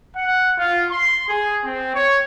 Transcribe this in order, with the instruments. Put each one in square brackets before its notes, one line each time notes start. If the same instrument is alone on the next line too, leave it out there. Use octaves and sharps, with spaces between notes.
[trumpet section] F#5
F4
C6
G#4
C4
C#5